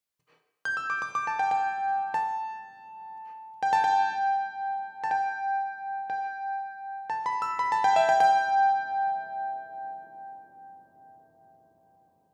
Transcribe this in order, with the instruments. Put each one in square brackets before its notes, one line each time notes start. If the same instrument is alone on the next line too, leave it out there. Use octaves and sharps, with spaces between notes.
[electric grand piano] G6
E6
D6
D6
D6
A5
G5
G5
A5
G5
A5
G5
A5
G5
G5
A5
B5
E6
B5
A5
G5
E5
G5
G5